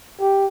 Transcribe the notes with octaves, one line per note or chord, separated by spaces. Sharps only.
G4